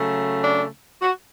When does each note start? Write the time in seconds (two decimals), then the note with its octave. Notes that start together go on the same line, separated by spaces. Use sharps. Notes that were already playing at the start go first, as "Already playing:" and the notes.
Already playing: C#3 F#3 A3
0.43 D4
1.02 F#4